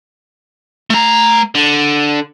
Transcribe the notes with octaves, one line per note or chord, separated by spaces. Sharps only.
A3 A#5
D3